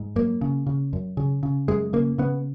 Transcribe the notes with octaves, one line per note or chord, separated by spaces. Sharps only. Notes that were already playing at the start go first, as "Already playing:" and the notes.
Already playing: G#2
F#2 A#3
C#3
C#3
F#2
C#3
C#3
F#2 G#3
C#3 A#3
C#3 B3